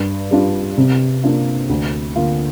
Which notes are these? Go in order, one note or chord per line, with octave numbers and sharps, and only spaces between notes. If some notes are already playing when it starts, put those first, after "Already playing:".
Already playing: G2
G3 D4 F4
C3
A#3 D4 F4
D2
D3 A#3 F4